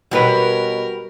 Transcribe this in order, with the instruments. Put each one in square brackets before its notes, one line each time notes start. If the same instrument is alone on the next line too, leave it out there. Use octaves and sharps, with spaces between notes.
[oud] B2 F#3 [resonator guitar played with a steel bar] G3 F#4 B4 [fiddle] A#4